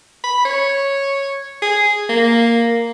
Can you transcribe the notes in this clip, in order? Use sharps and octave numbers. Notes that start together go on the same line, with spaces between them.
B5
C#5
G#4
A#3